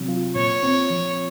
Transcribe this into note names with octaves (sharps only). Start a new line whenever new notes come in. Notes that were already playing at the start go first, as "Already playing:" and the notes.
Already playing: C3 F#3 C4
F4
A#2 C#5
C4
F3